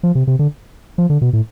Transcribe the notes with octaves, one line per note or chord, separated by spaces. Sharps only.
F3
C3
C3
D3
F3
D3
B2
A2